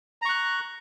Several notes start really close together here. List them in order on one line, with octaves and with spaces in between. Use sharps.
A#5 C#6 F#6